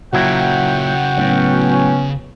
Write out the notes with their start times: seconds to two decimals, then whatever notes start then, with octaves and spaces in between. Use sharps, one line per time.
0.13 A#2 C#3 F#3 E4 F#4 A#4 F#5 G5
1.18 A2 F#3 B3 C#4